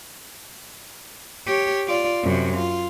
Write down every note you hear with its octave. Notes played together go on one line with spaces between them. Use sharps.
G4 C#5
F4 D5
F#2 C3
F4